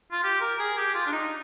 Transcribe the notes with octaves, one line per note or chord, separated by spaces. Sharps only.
F4
G4
A#4
G#4
G4
F4
D4
D#4